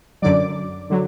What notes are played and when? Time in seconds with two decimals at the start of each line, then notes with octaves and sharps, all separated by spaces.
0.22 F#2 D3 F#3 D5 D6
0.90 D3 F#3